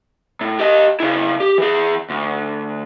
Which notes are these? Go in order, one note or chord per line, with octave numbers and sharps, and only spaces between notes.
A2
G4 D#5
C#3 E4
G4
E3 G#4
D2